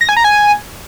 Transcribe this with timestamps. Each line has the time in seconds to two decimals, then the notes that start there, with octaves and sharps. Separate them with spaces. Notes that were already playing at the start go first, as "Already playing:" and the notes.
0.01 A#6
0.09 G#5
0.17 A#5
0.24 G#5